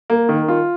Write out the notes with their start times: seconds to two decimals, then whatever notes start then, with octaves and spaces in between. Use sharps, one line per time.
0.10 A#3
0.29 D#3
0.48 F4